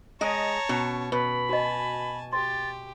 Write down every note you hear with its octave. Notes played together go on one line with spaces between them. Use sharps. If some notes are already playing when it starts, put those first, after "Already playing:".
G#3 C#5 D#5 A5 A#5
B2 C#4
B2 B4 B5
F#4 D#5 G#5 A5
G4 C6 A6